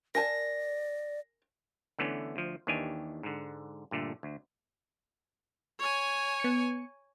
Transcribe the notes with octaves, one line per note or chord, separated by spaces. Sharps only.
A#4 D5 G#5 A5 A#6
D3 E3 A3 B3 C#4
D2 F3
D#2 D#3 E3 D4 G4 G#5
G#2 D3
G2 A#2 D3 A3
D2
C#5 G#5
B3 C#7